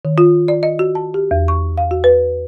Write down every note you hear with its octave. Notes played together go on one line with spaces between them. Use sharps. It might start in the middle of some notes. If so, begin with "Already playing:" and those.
D#3
F4
D5
D#5
F#4
A5
G4
E2
C#6
F5
F#4
B4